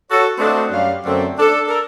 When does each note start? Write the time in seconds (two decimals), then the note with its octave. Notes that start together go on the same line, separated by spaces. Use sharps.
0.11 F#4 A4 C#5
0.39 A3 C4 D4 F#4 C5 D#5
0.71 F#2 G3 F5
1.05 F#2 D3 A3 C4
1.39 D4 A4
1.67 A4 A#4